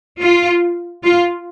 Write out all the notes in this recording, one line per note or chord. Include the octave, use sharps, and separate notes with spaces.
F4
F4